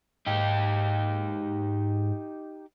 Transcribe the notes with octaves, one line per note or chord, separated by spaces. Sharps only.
G#2 D#4 G4